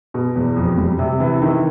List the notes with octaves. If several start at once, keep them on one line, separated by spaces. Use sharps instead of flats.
B2
E2
F2
G3
C3
E3
D#3